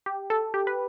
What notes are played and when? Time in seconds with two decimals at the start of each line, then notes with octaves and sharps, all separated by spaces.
0.06 G4
0.30 A4
0.54 G4
0.67 B4